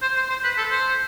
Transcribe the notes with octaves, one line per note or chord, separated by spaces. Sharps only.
C5
C5
C5
B4
A4
C5